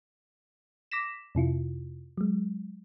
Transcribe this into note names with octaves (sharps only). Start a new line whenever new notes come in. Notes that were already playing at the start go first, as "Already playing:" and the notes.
D6 A#6 B6 E7
F2 C3 E4 F4
F#3 G#3